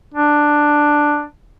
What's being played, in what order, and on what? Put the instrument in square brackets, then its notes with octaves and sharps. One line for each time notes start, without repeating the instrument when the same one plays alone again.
[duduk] D4